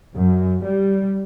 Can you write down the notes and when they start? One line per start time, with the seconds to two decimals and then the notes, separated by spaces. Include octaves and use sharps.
0.16 F#2
0.67 G3